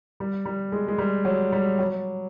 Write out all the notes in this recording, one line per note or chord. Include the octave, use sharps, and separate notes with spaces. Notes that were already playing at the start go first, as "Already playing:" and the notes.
G3
G3
G#3
G#3
G3
F#3
G3
F#3